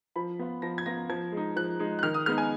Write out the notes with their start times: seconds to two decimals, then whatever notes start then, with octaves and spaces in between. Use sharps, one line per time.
0.16 F3 B5
0.39 B3 F4
0.62 F3 A#6
0.78 G#6
0.86 B3 F4 A#6
1.09 F3 G#6
1.32 G#3 D#4
1.56 F3 F#6
1.80 G#3 D#4
1.99 F#6
2.03 D#3 F6
2.14 D#6
2.26 G#3 B3 D#4 F6
2.38 G#5